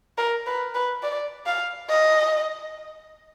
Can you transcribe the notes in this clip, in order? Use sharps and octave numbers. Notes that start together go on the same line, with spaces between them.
A#4
B4
B4
D5
F5
D#5